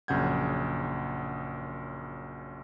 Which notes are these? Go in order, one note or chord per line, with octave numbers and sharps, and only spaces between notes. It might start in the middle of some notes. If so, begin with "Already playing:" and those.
A#1 F#2 C#3 F#5 G6 G#6